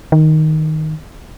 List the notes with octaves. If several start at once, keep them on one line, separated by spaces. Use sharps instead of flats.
D#3